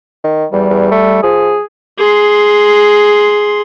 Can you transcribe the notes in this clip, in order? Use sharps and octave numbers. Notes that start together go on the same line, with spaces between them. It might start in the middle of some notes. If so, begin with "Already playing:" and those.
D#3
E2 G3
E2
A3
F3 G#4
G#4 C6